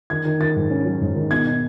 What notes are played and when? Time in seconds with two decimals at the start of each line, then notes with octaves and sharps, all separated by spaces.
0.10 D#3 G#6
0.25 D#3
0.40 D#3 A6
0.56 G#2
0.70 C#4
0.85 F#3
1.01 G#2
1.15 D#3
1.31 B2 G#6
1.47 D#4